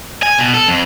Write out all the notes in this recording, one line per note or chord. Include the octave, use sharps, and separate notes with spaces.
G#5
B2
A4
F2